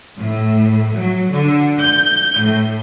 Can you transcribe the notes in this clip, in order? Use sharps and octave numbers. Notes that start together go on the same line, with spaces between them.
A2
F#3
D3
G6
A2